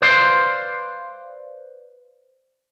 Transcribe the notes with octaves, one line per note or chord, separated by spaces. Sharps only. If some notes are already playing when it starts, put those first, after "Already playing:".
B4 C5 D5 F5 C6